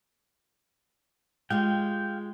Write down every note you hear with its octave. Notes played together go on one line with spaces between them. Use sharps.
G#3 F4 G4 F5 G5